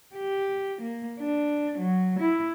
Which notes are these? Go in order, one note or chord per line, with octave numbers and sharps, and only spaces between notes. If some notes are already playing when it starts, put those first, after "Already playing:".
G4
A#3
D4
F#3
E4